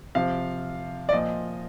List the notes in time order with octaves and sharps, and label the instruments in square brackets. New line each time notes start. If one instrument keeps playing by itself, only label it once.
[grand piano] C3 F3 F5
D5
A#2 F3 D#5